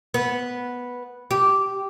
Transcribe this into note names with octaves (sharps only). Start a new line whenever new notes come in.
B3
G4